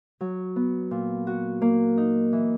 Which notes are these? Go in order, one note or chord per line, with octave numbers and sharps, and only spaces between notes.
F#3
B3
A#2
F#4
A#3
D#4
E3